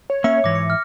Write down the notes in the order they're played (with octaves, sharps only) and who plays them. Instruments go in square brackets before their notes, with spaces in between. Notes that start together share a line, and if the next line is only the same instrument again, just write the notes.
[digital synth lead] C#5
[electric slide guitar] A#3 C#4 [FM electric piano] E5 [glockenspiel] C#7
[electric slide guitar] G#2 E3 [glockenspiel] D6 A#6
[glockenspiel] C#7
F6